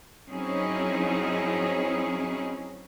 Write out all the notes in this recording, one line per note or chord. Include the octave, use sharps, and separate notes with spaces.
F#3 C4 C#4 D#4 E4 G#4